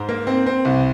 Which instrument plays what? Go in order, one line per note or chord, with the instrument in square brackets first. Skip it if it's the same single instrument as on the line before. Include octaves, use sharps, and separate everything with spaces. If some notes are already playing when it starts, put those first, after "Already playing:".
Already playing: [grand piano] G#2 C5
A#3
C4
C4
C2